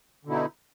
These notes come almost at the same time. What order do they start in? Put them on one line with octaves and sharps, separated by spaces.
D3 B2 E4 D#4